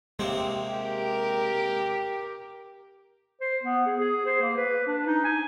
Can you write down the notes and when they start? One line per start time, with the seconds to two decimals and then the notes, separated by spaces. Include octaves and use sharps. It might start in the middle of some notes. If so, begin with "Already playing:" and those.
0.19 D#2 C3 G#3 C4
0.70 G4 A#4
3.40 C5
3.63 B3
3.86 G#4
4.00 G#4
4.26 C5
4.42 A#3
4.56 B4
4.87 D4
5.07 D#4
5.24 G#5